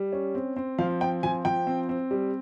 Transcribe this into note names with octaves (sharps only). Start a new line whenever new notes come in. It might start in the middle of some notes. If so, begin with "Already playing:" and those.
Already playing: G3
C#4
C4
C4
F3 F5
C4 G5
F3 G#5
F3 G5
C4
C4
G3